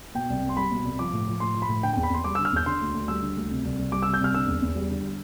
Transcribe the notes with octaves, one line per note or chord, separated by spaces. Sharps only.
B2 G5
C2
C2
C6
G3 B5
B2
C2
F3 D6
A2
F3
A2 C6
F3
B5
A2
D3 G5
E2 G5
B5
E2 C6
G3 D6
D3 E6
F6
E2 G6
D3 C6
D2
D2
G3 E6
D3
D2
C3
C2
C2
G3 D6
C3 E6
G6
C2 F6
D3 E6
E2
E2
G3
D3